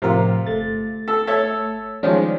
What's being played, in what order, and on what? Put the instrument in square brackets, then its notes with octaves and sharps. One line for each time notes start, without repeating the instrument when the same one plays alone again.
[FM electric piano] A2 F3 A#4 [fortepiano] C3 F4
[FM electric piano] G1 A3 A6
[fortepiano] A4
A4 C#5 E5
[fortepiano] D#3 F3 G#3 [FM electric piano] G3 C#4 D4